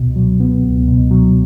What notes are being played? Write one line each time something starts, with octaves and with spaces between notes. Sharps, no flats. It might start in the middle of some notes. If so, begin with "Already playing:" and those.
Already playing: C#2 B2
F#3
B3
C#2
B2
F#3